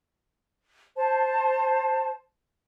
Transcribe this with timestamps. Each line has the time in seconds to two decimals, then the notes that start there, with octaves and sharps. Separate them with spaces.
0.96 C5 A5